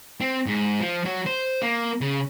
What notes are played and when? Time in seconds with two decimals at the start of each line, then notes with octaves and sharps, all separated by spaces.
0.21 C4
0.46 G#2
0.80 F3
1.05 F#3
1.26 C5
1.62 A#3
2.01 C#3